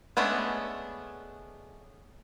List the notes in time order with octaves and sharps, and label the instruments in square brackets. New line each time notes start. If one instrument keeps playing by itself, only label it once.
[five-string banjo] G#3 A3 B3 C#4 D4